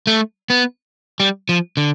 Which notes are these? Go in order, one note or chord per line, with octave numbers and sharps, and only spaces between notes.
A3
B3
G3
F3
D3